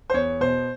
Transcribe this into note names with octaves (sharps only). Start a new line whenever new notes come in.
C5
E2 C#5
B2 C5